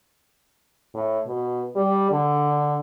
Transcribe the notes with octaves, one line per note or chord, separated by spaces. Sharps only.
A2
B2
G3
D3